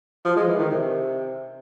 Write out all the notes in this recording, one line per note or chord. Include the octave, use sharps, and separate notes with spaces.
F3
G#3
E3
D#3
C3